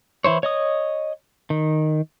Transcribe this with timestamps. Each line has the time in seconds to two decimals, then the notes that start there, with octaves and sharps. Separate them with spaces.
0.24 E3 E4 C5 C#5
0.43 C#5 D#5 D#6
1.50 D#3